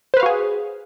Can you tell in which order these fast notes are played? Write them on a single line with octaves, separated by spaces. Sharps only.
C5 B4 F5 F#4 G#4